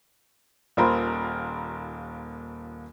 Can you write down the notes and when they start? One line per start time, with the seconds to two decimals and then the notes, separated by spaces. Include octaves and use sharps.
0.77 D#1 D#2 F4 A#4 C5 B5